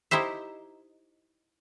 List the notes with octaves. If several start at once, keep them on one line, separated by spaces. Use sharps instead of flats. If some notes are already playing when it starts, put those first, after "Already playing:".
D#4 E4 G4 C5 E5